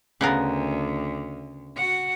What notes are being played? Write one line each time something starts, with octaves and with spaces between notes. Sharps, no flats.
D2 C#3 B3 A#4
F#4 F#5